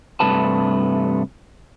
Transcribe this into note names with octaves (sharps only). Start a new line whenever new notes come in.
G2 C3 A3 B4 A5